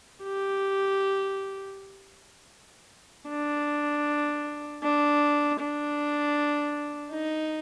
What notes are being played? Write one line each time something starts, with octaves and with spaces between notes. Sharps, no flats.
G4
D4
D4
D4
D#4